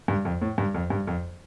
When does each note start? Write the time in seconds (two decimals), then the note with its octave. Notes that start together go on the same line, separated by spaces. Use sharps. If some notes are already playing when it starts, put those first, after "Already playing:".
0.08 G2
0.25 F2
0.42 A2
0.58 G2
0.74 F2
0.90 G2
1.07 F2